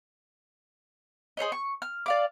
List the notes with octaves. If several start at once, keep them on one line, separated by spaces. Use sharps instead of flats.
G#4 C5 C#5 D#5
C#6
F6
D5 F5 D6